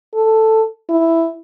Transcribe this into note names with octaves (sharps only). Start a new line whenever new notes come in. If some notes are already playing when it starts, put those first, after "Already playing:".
A4
E4